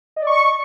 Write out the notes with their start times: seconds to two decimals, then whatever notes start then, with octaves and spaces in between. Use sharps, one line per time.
0.16 D#5
0.22 D5
0.27 C#6